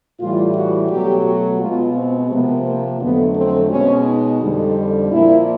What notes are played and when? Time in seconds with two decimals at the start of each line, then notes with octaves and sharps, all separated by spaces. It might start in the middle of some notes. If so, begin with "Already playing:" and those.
0.20 A2 E3 G3 F4
0.55 F#4
0.90 B2 F#3 A3 G4
1.25 F#4
1.60 B2 G#3 F4
1.96 C4
2.31 C3 F3 A#3 B3
2.65 A#3
3.01 F2 D3 F#3 A3 B3
3.36 C4
3.71 B2 G#3 C#4
4.06 D#4
4.42 F2 D3 G3
5.11 A#2 F3 A#3 E4